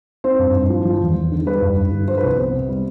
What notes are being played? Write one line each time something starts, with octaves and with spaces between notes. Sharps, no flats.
C4 C5
G2
G2
F3
F3
E2
E2
D3
G3 B4
G2
G2
D3
F3 C5
B4
C2 C5
B3
C3
G3